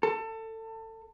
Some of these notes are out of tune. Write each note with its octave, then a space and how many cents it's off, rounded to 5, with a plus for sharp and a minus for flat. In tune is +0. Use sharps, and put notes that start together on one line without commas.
A4 +25